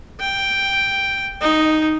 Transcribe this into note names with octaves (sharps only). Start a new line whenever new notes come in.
G5
D#4